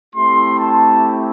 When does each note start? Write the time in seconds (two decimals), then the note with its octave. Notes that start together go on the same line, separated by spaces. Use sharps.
0.15 A3 C4 E4 G4 C6
0.59 A5